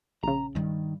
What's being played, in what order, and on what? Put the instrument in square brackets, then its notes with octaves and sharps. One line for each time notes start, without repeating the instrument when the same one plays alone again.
[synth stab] A#1 C#3 [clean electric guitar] A#5
[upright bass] G2 G3 [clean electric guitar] D#3